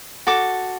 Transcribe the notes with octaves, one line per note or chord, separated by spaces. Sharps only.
F#4 A4 D6